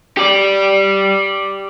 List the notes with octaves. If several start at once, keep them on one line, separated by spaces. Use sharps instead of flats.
G4 D5